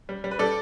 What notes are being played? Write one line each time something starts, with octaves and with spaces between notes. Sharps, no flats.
G3
G3
B4
G3 A4 D5